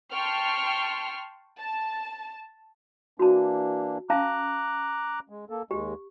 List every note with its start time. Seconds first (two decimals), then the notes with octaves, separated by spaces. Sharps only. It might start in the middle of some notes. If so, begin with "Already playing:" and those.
0.13 G5 A5 C6 C#6 F6
1.60 A5
3.19 E3 A#3 D4 F#4 A5
4.10 C#4 F5 A5 A#5 D6 F#6
5.29 G#3
5.50 A#3 A4
5.71 D#2 G#3 G4